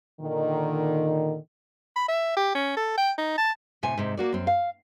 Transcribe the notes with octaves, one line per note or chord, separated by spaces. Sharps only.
A#2 D3 D#3
B5
E5
G4
C#4
A4
G5
D#4
A5
A2 C3 G#5
G#2 C3
A#3 F#4 D5
F#2 C4
F5